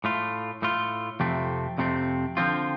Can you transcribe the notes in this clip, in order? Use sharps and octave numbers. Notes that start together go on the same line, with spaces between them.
A2 A3 F4
A2 A3 F4
F2 C3 A3 C4
F2 C3 A3 C4
D3 F3 C4 F4